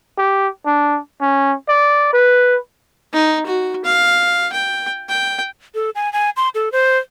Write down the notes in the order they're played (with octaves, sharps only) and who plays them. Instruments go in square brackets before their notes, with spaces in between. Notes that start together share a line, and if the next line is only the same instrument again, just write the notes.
[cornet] G4
D4
C#4
D5
B4
[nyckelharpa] D#4
F#4
F5
G5
G5
[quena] A4
G#5
G#5
C6
A4
C5